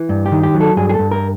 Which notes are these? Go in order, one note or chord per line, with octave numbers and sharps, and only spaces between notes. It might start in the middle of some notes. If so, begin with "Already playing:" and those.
Already playing: E3
G2
G4
D#3
G4
F#3
A4
G2 G#4
G#4
A4
G2
A#4